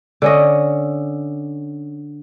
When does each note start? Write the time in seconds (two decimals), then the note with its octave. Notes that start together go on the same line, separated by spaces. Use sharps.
0.22 D3 C#4 D#5